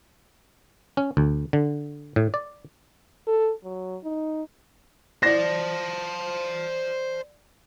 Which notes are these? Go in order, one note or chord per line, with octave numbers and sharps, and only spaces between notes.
C#4
D2
D3
A2
D5
A4
F#3
D#4
C5 D5 A5 A#6